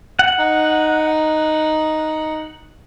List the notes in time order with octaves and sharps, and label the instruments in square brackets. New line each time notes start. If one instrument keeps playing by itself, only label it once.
[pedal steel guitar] F#5
[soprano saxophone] D#4